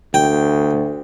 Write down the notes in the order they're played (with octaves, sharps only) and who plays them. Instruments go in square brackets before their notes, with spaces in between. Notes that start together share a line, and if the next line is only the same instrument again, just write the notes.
[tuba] D2 [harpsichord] G5